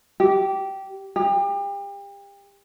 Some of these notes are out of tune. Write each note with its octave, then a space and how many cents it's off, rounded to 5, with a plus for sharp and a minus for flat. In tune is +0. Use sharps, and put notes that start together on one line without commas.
G4 -15
G4 +35